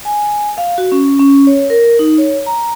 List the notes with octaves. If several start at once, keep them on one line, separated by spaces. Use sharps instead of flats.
G#5
F5
F#4
C#4
C#4
C#5
A#4
D#4
C#5
A#5